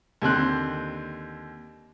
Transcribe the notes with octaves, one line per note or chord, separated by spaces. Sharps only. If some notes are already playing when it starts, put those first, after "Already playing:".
D#2 D3 C4 F#6